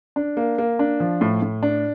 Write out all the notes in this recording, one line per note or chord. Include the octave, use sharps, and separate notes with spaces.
D4
A#3
A#3
D4
F3
A2
A2
D4